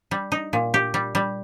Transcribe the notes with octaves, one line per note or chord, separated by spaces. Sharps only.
G3
D#4
A#2
G4
G3
G3